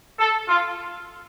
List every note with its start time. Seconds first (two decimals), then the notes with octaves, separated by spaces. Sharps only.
0.18 A4
0.47 F4